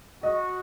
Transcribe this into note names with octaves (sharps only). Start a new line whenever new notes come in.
F#4 D#5